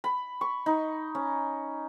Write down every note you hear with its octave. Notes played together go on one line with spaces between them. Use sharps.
B5
C#6
D#4
C#4